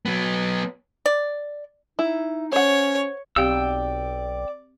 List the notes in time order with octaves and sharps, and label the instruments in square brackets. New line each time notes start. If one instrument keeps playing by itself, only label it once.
[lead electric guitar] F#3 B3
[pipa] D5
[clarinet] D#4 [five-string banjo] E4
[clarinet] C#4 [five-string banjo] C5 F#5 [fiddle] C#5
[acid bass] B1 [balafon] C4 G4 F5 [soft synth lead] D5 [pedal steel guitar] G5 E6